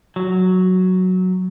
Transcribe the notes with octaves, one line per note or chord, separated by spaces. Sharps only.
F#3